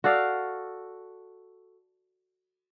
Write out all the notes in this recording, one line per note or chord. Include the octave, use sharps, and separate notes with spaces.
F#4 A4 D5 F5